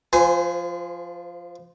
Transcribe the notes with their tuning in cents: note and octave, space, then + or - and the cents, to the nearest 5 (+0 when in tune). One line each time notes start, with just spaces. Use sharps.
F3 +0 C5 -35 G#5 +0